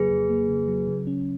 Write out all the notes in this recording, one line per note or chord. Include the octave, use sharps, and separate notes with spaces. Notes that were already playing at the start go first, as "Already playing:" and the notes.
Already playing: F2 C#3 F#3 A#3 G#4 B4
F2
A#3
C#3
F#3
C#3
C#4